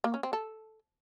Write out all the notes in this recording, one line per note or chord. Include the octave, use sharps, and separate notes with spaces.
A#3
C#4
C4
A4